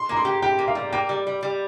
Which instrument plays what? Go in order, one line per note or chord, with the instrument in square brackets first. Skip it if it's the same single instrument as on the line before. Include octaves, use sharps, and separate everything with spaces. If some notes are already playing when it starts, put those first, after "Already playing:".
Already playing: [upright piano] C6
[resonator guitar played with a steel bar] A#3 [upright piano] A#5
[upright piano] C6
[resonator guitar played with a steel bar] G4
[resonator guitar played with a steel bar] G4 [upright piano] G5
[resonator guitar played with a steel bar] A#3
[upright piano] F5
[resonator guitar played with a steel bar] G3
[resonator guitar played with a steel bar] A#3 [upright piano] G5
[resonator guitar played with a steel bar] G3
G3
G3